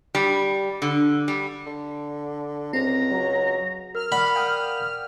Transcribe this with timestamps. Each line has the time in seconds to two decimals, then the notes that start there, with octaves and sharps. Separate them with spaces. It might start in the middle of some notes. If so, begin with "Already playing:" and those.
0.15 G3
0.82 D3
1.28 G3
1.66 D3
2.73 C#2 C4 A#5
3.11 F#3
3.95 A#4 F6
4.12 D5 F#5 B5
4.35 F5 G5 D#6